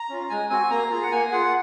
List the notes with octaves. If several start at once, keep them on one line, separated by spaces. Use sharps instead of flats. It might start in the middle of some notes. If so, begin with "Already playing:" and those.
Already playing: A#5
C#4 F4
G#3 G#5
C4 F#4 G#5
A#3 A#5
F4 G#4
F#5
A#3 G#5
F4 G#4 F#5